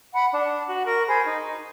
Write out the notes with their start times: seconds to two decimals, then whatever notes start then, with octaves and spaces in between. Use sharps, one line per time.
0.13 F#5 B5
0.32 D4
0.68 F#4
0.85 A#4 C#6
1.08 G#4 C5 B5
1.25 D#4